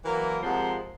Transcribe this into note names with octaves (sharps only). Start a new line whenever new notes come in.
E3 F#3 A#3 A#4
C3 F3 G#3 A#4 C5 F#5